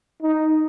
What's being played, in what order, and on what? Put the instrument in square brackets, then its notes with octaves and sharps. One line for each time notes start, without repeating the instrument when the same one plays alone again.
[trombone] D#4